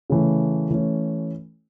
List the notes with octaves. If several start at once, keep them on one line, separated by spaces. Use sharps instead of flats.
C#3 E3 A3
E3 A3 C#4